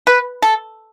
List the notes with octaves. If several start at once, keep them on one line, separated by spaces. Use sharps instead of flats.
B4
A4